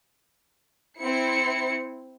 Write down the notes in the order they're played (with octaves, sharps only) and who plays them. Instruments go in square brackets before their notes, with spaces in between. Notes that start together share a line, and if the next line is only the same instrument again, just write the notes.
[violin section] C4 E4 C#7